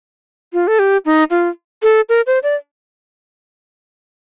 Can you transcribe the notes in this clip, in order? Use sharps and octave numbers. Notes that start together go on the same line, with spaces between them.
F4
A4
G4
D#4
F4
A4
A#4
C5
D5